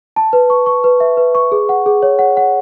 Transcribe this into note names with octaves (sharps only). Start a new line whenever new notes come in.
A5
B4
C#6
C#6
B4
E5
B4
C#6
G#4
F#5
G#4
C#5
F#5
F#5